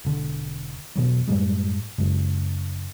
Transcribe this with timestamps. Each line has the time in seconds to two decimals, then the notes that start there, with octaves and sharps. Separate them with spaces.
0.05 E1 D3
0.96 E2 B2 E3 F#3
1.28 F#2 A2 G3 G#3
1.98 F#2 C#3 G#3